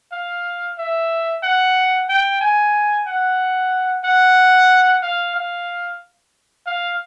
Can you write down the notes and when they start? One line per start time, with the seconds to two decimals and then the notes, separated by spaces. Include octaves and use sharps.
0.12 F5
0.78 E5
1.44 F#5
2.09 G5
2.41 G#5
3.07 F#5
4.05 F#5
5.03 F5
5.36 F5
6.66 F5